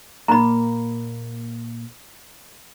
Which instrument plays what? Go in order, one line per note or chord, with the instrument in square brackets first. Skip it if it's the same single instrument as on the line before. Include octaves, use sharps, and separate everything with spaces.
[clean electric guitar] A#2 A#3 [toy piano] A#5 B5